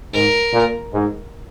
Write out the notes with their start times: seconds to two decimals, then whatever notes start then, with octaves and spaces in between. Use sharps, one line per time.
0.13 G#2 A#4
0.53 A#2
0.93 G#2